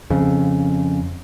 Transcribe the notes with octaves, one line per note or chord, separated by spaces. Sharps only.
F2 C#3